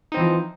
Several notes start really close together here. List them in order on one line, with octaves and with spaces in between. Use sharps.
D#4 C4 E3 F3